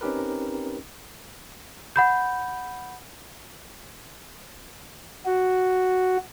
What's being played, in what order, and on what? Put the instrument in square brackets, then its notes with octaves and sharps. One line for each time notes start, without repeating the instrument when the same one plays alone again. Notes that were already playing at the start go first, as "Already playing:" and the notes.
[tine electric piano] C4 C#4 D#4 G4 A#4 B4
[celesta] F#5 B5 G6
[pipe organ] F#4